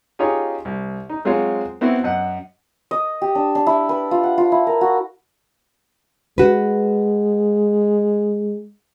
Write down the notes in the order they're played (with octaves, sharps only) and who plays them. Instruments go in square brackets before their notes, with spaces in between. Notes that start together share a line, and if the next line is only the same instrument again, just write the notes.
[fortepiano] C#4 D#4 F4 G4 G#4 C#5
C2
D#4
F#3 G#3 C4 F4 C5 C#5
B3 C4 E4 F#4
F#2 D#5 F#5
[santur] D#5
G4
D4
D4
E4
B4
F4
F#5
F4
E4
A#4
F#4
[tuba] G#3 [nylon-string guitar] F#4 B4